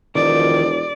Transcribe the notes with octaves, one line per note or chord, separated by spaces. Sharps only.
E1 D#3 F3 D5